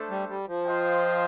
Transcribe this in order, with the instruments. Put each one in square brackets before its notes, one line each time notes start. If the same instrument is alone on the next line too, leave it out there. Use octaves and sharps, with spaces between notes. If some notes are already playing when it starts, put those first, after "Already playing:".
Already playing: [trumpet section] A3 D4 A4 C5
[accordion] G3
G3
F3
[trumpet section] F4 C5 D#5 G5